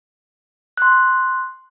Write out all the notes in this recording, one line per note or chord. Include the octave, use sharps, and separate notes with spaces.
C6 F#6